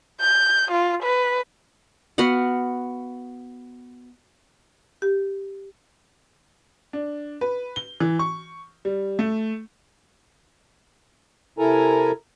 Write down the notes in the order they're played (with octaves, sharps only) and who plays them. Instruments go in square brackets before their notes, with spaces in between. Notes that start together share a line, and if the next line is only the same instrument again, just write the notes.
[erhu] G6
F4
B4
[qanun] B3 F#4 F5 F#5
[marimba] G4
[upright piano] D4
B4
G7
E3
C#6
G3
A3
[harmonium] C3 E4 A4 A#4 G#5 A#5